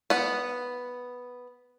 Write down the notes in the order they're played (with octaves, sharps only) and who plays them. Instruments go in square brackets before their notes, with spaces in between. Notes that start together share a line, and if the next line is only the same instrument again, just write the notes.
[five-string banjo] B3 F#5